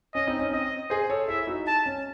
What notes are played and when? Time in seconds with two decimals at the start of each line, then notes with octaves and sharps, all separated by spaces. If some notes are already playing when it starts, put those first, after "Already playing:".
0.14 C#4 D#5
0.27 C4 D#4
0.39 C#4
0.52 C4 D#5
0.90 G#4 C5
1.10 A4 C#5
1.28 E4 G#4 E5
1.47 D#4 F#4
1.67 A5
1.86 C#4